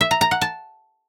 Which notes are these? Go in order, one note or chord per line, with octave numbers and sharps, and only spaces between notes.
E5
A#5
A#5
F#5
A5